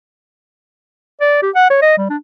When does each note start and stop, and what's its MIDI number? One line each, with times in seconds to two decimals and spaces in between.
1.21 1.42 74
1.42 1.50 67
1.55 1.69 78
1.70 1.78 73
1.82 1.97 75
1.98 2.05 55
2.10 2.17 62